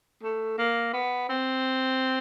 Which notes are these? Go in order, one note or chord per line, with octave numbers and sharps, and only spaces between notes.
A3
A#3
B3
C4